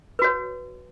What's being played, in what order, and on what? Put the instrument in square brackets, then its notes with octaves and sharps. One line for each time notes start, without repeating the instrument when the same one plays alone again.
[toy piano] B4
F#4
C#5